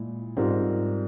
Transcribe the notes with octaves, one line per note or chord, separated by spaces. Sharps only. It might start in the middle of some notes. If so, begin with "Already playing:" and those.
Already playing: A#2 G#3 E4
G#2 G3 C4 F4 A#4